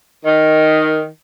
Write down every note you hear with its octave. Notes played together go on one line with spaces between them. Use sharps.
D#3